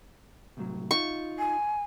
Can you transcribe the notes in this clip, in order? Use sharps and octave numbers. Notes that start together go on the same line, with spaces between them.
C2 A2 F#3
D#4 F4 C#6
G#5